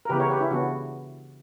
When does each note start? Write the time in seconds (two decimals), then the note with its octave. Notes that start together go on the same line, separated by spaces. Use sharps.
0.05 A#4
0.09 C#3 E3 B3 G4 B4
0.20 A#4 C#5
0.30 G4 B4
0.40 C#4 E4
0.51 C#3 E3 B3 D4 F#4